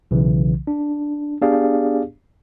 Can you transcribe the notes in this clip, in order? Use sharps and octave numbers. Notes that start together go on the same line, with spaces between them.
B1 C#3 E3
D4
B3 D4 G4 G#4 D5 F5